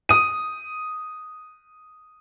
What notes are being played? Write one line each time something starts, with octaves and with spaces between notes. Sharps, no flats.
D#6 D#7